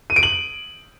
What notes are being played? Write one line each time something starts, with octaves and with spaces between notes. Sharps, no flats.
D#7
D7
F#7